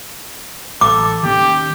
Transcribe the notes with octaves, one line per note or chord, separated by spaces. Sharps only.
A1 A4 D6
D#3 A#3 C#4 G4